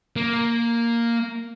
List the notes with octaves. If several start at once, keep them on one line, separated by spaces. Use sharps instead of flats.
A#3